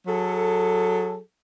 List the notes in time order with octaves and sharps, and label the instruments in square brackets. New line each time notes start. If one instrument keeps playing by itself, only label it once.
[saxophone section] F#3 G#4 A4